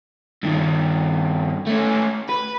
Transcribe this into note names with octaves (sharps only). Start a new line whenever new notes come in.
G2 D#3
A3 C#4
B4